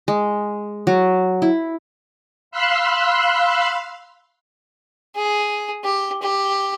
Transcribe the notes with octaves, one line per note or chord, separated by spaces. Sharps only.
G#3
F#3
E4
F5 B5 C6 E6 F#6
G#4
G4
G4